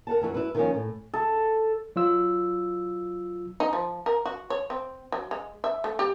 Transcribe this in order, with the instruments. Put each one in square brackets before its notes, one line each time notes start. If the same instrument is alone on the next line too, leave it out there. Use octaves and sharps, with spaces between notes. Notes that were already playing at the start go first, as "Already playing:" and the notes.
[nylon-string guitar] A#4 F#5 A5
F#2 E3 F#4
E4 B4
D#3 F3 A3 A#3 C#4
A2
[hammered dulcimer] A4
[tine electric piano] F#3 F4 E6
[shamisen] D#4
F3
A#4
F#4
C#5
C4
F#3
G#3
E5
A3
G4